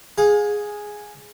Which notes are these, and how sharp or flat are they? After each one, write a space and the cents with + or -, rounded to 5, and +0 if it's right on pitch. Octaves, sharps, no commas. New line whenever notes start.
G#4 +0 F5 +40